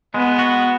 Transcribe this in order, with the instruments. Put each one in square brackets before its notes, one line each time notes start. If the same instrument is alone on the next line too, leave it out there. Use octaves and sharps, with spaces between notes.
[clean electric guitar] G#3 [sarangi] B3
[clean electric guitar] F#4